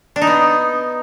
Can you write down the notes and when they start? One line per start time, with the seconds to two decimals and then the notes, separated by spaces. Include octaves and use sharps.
0.16 D4
0.21 D#4
0.27 B3